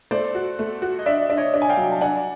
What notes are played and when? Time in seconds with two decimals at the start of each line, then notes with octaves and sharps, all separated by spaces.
0.11 A3 C5 D5
0.35 F#4
0.59 A3
0.82 F#4
0.99 D#5
1.06 D4 D5 E5
1.30 D4 E5
1.37 C#5 D#5
1.54 D4
1.62 G#5
1.69 F5 G5
1.77 F#3
1.92 A5
2.01 D4 F#5 G#5